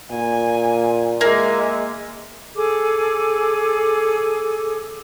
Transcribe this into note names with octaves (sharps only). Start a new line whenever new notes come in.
A#2 G#5
G#3 A#3 E5 G#5
G#4 A4 D6